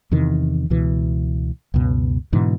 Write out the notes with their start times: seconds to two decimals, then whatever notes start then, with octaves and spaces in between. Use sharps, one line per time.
0.11 E2 C3 D#3 E3
0.70 C#2 B2 E3
1.74 C#2 F#2 B2
2.33 G#2 B2 D3 E3